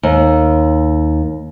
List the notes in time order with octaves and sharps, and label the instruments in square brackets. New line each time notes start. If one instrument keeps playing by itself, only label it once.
[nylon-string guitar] D#2